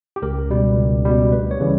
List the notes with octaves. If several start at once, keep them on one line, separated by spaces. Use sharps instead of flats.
G4
C#2 A#4
B2 G3
C#2
B2 G3
D2 B4
C#5
C#3 E3 G3